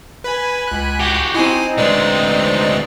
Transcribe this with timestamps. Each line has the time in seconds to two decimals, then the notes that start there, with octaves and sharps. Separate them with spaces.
0.24 B4 G#5 B5
0.68 C#2 F#6
1.00 F#4 G4 G6
1.34 C4 D#4 E4 G#5 C7
1.78 D2 G#3 B4 D5 D#5